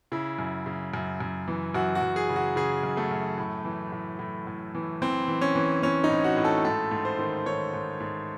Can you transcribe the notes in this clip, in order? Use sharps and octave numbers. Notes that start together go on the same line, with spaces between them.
C#3 E4
F#2
C#3
F#2
F#2
E3
F#2 F#4
F#4
F#2
G#4
C#3
F#4
C#3 G#4
F#2
A3
F#2
A2
E3
A2
A2
A2
E3
E3 C4
E3
C#4
E3
E3 C#4
D#4
A2
F#4
A2
A4
G#2 A4
G#2
C5
D#3
D#3 C#5
G#2
G#2